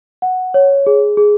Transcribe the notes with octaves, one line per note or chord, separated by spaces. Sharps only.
F#5
C#5
G#4
G#4